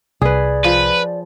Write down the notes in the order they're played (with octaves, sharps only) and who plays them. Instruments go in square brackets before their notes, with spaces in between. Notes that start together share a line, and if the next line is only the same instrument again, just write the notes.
[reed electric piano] C2 [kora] G#4 B4 [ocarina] D5
[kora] F3 [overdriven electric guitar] B4